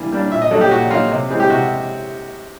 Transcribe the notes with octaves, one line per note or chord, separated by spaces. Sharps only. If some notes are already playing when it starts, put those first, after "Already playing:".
Already playing: E3 G3 A#3 D4
G3 A#3 D4
A#2 E5
D#5
F#3 A#3 D#4 A4
G4
A#2 F#4
F#3 A#3 D#4 F4
C3
E3 G#3 C4
G4
C3 F#4